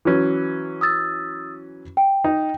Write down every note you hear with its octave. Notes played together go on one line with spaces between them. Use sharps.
E3 F#3 C#4
D#6 E6 A6
G5
D#4